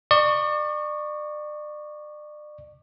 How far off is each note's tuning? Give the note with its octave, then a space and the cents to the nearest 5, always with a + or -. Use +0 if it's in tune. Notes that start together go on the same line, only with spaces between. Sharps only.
D5 +35 C#6 +5